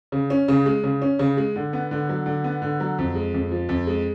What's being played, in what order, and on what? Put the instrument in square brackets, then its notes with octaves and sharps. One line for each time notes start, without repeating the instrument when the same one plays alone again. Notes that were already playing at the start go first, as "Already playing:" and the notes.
[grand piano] C#3
C#4
C#3
G#3
C#3
C#4
C#3
G#3
D3
B3
D3
F#3
D3
B3
D3
F#3
F2
G#3
F2
F3
F2
G#3